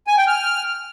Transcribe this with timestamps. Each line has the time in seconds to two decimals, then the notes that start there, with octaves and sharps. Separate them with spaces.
0.07 G#5
0.17 G5
0.28 F6